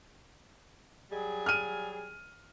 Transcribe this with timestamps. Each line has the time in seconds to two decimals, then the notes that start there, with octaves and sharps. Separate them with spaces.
1.11 F#3 G3 G#4
1.46 F6 D#7